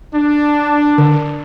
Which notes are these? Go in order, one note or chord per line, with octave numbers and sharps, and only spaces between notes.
D4
D3